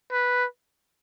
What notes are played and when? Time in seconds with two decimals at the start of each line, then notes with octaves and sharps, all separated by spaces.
0.12 B4